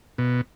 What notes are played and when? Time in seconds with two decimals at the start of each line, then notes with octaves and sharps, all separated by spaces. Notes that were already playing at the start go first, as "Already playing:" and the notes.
0.18 B2